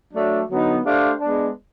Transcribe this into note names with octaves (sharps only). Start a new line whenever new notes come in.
F#3 A3 D4
D3 F#3 B3 D#4
A3 D4 G4 C5 F5
G#3 B3 D4